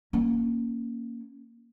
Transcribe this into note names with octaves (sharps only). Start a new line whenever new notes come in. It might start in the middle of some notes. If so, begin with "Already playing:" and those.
A#3 C#4